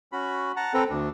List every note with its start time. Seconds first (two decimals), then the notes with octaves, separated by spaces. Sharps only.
0.12 C#4 F#4 B5
0.57 F#5 A5 A#5
0.74 C4 A4 B4 A#5
0.90 D2 D4